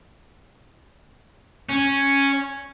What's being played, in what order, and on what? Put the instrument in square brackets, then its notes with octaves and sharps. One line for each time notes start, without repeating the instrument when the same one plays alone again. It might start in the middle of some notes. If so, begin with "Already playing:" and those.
[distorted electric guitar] C#4